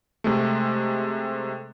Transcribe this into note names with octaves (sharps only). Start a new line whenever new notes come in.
C3 G#3 A3